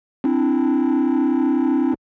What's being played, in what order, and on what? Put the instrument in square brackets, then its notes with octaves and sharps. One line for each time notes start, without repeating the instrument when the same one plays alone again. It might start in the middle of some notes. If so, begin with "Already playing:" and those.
[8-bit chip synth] C4 D4 E4